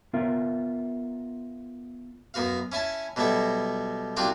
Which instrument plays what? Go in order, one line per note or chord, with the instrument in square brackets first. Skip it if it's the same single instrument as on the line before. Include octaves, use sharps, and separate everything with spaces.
[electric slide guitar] B3 F4 A#4 E5
[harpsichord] F#2 B3 F#4 F5
C#4 E4 G#5 A5
B2 F#3 G3 E4 A4
C2 D4 F4 F#4 G5 D6